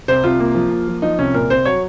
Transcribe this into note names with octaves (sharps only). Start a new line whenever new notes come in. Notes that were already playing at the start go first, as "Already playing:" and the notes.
C2 C5
C2 F4
A#3
F3
A#3
F3
F3 D#4
C2 C#4
A#2 A#4
C2 C5
F#3 C#5